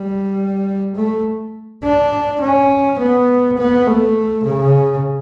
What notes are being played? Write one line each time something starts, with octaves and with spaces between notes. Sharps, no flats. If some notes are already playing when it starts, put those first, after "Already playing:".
Already playing: G3
A3
D4
C#4
B3
B3
A3
C#3